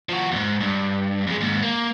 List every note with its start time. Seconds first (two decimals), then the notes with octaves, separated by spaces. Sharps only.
0.09 F3 F#4
0.32 E2 G#2
0.61 G2
1.27 F2 G#3
1.41 D#2 G#2
1.62 A#3